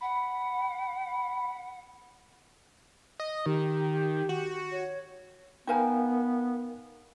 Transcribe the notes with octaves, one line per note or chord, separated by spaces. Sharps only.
F#5 B5
D#5
D#3 G4
F#4
C#5
B3 D#4 A#4 B4 F5 G5 G#5